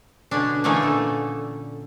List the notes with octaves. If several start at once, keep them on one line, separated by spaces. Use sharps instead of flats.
B2 D3 C#4 D4
D3 E3 A3 A#3 C#4 D#4
A#2 A4